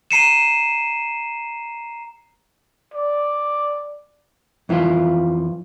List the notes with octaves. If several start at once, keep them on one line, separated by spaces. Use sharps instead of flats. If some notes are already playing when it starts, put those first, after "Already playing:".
A#5 C7 C#7 D#7 E7
D5
F2 E3 E4 F4